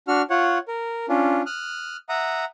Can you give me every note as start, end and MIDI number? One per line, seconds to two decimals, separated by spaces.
0.08 0.22 62
0.08 0.22 66
0.08 0.22 89
0.30 0.58 65
0.30 0.58 73
0.30 0.58 78
0.68 1.06 70
1.09 1.42 61
1.09 1.42 62
1.09 1.42 65
1.46 1.97 87
1.46 1.97 89
1.46 1.97 90
2.09 2.45 76
2.09 2.45 78
2.09 2.45 82
2.09 2.45 87